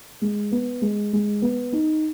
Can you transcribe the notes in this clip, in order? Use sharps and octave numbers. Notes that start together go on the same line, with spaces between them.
G#3
B3
G#3
G#3
B3
D#4